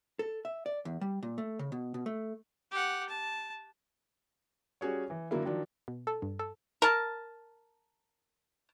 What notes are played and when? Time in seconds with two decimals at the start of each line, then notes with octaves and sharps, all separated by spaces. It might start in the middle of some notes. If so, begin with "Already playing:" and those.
0.19 A4
0.45 E5
0.66 D5
0.85 E2
1.01 G3
1.23 A#2
1.38 A3
1.59 C#3
1.72 B2
1.94 B2
2.06 A3
2.71 G4 F#5
3.09 A5
4.81 G3 C#4 F#4 G#4 C#5
5.10 E3
5.31 D3 F#3 A#3 E4
5.45 D#3 F3 F#3 D4
5.88 B2
6.07 A4
6.22 G2
6.39 A4
6.82 A#4 A5